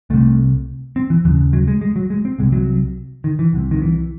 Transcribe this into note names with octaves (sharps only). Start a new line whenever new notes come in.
C2 C3 A3
C4
E3
D#2 C#3 E3
F#3
G#3
G#3
F#3
G#3
C4
C2 C3 G#3
F#3
D#3
E3
C2 C3
D#3
E3